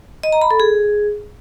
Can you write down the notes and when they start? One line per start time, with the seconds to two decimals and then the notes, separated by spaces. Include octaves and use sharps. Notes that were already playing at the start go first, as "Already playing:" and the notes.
0.23 D#5
0.32 A#5
0.42 B5
0.51 A4
0.60 G#4